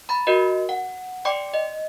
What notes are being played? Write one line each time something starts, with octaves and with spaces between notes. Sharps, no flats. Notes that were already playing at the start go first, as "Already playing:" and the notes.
A#5 B5 A6
F#4 A#4 D#5
F#5
D5 G5 C6 D6 C#7
D#5